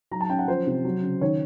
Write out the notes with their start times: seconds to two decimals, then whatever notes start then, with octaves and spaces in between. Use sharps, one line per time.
0.11 F#3 A#5
0.21 A5
0.30 C#4 G5
0.39 F#5
0.48 F3 C5
0.67 C3
0.85 F#3
1.03 C#3
1.21 D#3 C#5